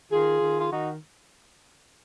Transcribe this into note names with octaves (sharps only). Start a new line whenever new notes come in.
D#3 F4 G#4
D#3
F4
D#3 D#4 F#4